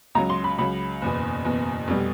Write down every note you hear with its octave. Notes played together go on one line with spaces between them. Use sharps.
C#2 C#3 F#3 A#5
C6
B5
C#2 C#3 F#3 B5
F#1 E2 B2
F#1 E2 B2
F1 B2 G3